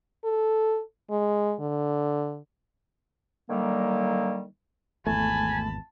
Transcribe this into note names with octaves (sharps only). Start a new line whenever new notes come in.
A4
G#3
D3
D3 D#3 F#3 G3 A#3
G#1 E2 A3 G#5 A5 B5